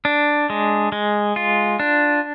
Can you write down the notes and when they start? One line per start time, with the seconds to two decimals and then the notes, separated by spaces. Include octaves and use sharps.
0.05 D4
0.50 G#3
0.92 G#3
1.36 F4
1.80 D4